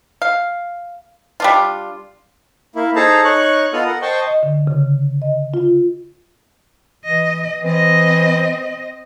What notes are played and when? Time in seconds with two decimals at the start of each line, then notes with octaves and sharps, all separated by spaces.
0.22 F5
1.40 G3 D4 F4
2.75 A#3 E4
2.96 D#4 G#4 A4 C5 A5 A#5
3.25 D#4 C#5 C#6 F#6
3.73 B3 F4 A4 D#5 D#6 F6
3.86 A#4 F#5
4.02 C5 D#5 G5 A5 C6 C#6
4.27 D#5
4.43 D3
4.67 C#3
5.22 D#5
5.54 F4
7.05 E3 D#5
7.63 E3 C4 D#5